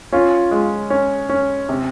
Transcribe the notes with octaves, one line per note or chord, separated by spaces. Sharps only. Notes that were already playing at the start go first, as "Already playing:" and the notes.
C#4 F4
G#3
C#4
C#4
C3